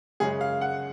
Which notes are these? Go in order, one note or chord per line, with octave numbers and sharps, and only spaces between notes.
F#2 C#3 G#3 C#4 G#4
F5
F#5